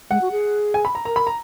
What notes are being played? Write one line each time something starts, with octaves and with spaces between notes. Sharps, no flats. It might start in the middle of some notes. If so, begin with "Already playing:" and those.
G#3 F#5
F#4
G#4
G#5
B5
A#5
A#4 A#5
B5
A#5